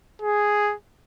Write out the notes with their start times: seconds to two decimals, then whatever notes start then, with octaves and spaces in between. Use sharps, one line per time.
0.22 G#4